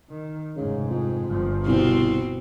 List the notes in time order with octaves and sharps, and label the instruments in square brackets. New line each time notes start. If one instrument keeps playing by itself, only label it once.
[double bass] D#3
[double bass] F1 G#2 [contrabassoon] C#3
[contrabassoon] F2
[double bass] G1 F3
[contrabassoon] C2 [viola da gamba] B2 C4